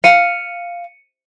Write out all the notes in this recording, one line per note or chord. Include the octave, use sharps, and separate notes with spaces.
F5 C#7 D#7